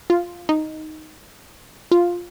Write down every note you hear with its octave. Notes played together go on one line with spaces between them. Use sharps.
F4
D#4
F4